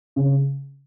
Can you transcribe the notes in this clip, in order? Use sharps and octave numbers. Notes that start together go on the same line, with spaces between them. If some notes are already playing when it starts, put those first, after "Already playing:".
C#3